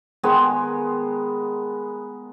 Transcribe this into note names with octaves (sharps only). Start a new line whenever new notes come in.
D#3 G#3 B3 G#5